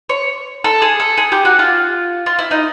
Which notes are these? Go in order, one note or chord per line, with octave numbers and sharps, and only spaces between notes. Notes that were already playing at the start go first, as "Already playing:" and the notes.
C#5
A4
G#4
A4
G#4
G4
F#4
F4
F4
E4
D#4